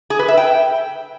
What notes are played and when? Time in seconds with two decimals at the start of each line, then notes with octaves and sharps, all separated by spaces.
0.10 G#4
0.19 B4
0.28 E5
0.37 G5